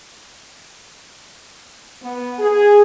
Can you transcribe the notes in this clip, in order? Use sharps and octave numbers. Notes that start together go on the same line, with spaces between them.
B3
G#4